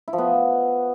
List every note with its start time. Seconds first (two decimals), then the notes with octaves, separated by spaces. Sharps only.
0.08 E4
0.13 F3
0.18 B3